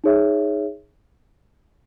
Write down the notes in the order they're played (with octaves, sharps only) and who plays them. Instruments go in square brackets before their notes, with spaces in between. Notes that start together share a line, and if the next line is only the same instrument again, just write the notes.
[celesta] D#4 G#4 C#5 E5